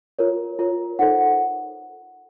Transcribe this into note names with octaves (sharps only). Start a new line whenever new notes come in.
F4 A#4 C#5
F4 A#4 C#5
D#4 A4 C5 F#5